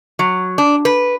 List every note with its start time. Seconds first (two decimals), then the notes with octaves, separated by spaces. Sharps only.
0.19 F#3
0.58 D4
0.85 B4